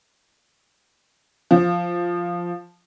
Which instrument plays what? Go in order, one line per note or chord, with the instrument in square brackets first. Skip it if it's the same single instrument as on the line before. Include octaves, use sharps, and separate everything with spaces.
[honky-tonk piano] F3